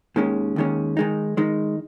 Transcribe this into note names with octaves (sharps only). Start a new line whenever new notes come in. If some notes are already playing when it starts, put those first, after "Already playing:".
D#2 D#3 G#3 C#4
D#2 D#3 G#3 C#4
D#3 G#3 D#4
D#3 G#3 D#4